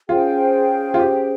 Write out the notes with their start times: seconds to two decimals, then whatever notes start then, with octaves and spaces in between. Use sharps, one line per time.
0.09 C#4 F4 G#4 C5 G5
0.94 F4
0.99 G4